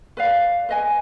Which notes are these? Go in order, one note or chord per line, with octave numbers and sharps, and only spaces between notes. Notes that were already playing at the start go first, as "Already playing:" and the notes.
B4 D5 F5
B4 D#5 G#5